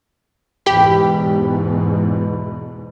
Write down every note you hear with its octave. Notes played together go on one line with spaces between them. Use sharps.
E2 G#2 B2 G4 B5